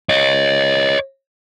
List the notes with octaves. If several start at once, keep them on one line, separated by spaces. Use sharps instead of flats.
C#5 D#5